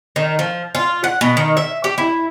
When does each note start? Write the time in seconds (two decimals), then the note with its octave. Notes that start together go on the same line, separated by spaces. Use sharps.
0.16 D#3
0.39 F3
0.75 F4
1.04 F#5
1.21 B2
1.37 D#3
1.57 E5
1.84 G4
1.98 E4